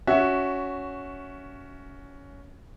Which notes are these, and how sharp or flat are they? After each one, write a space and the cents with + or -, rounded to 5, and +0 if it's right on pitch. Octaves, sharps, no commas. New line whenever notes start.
C#4 +15 F#4 +0 E5 +0